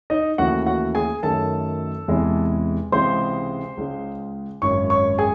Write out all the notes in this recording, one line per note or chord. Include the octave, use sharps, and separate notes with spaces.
D#4 D#5
D#2 C#3 E3 A3 F#4 F#5
F#4 F#5
G#4 G#5
F#2 D#3 F#3 A3 A4 A5
E2 C3 E3 G#3
C#2 C3 E3 G#3 C5 C6
C#2 C#3 G#3
G#1 F#2 C#3 C#5 C#6
C#5 C#6
G#4 G#5